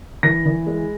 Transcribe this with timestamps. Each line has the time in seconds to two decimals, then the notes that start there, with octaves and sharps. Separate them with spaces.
0.23 E3 A#6
0.45 E3
0.66 G#3